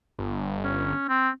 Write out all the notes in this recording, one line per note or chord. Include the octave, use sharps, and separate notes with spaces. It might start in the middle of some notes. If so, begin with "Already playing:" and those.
G1
C#4
C4